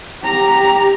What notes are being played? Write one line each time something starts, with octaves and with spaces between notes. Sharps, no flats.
G4 A#5